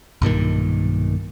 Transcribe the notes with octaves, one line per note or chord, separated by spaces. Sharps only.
B1 G2 A#2 D#3